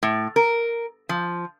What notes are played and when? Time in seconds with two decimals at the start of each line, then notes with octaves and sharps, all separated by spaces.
0.03 A2
0.36 A#4
1.09 F3